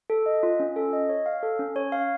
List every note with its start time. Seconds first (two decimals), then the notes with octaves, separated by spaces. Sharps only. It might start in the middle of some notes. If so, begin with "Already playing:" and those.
0.10 A4
0.26 D#5
0.43 F4
0.60 C#4
0.76 A4
0.93 D#5
1.09 C#5
1.26 F5
1.43 A4
1.59 C#4
1.76 C#5
1.92 F5